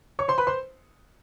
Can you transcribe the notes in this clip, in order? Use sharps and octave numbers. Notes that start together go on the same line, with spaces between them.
C#5 C#6
C5 C6
B4 B5
C5 C6